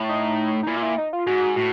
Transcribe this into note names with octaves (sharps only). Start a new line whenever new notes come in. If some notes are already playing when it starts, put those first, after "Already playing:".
Already playing: A2
D#4
D#4
A#2 E4
F4
E4
D#4
F4
G#2 F#4
A2 F#4